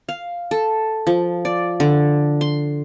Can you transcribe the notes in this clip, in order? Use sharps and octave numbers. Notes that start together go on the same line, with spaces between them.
F5
A4
F3
D5
D3
C6